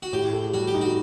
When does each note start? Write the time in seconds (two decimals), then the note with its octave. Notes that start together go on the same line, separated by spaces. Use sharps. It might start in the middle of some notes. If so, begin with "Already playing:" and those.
0.03 F#4
0.13 A2 G4
0.33 A4
0.54 G3 F#4
0.67 G4
0.74 D#4
0.81 F#4